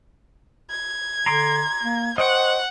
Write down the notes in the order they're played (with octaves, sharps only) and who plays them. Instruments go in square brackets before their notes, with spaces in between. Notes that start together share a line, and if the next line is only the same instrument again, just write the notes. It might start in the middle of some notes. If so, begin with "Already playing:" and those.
[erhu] G#6
[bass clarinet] D3 [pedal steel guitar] A#5 C6 D6
[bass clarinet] A#3
[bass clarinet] C5 [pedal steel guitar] D#5 G5 C#6 [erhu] F#5